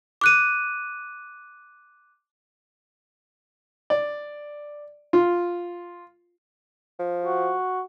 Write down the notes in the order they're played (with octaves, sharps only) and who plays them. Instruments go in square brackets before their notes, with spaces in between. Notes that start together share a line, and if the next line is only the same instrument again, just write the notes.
[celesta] D6 F#6 D#7
[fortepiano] D5
F4
[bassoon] F3
[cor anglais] F#4